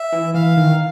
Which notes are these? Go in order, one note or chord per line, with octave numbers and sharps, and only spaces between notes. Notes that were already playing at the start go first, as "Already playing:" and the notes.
Already playing: E5
E3
E3 F5
D#3